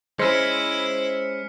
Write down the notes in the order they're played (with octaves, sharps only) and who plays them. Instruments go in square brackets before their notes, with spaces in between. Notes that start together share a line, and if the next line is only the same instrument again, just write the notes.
[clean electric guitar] G#3 C#4 [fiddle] E4 [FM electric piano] C5 E6 [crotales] F6 B6 C#7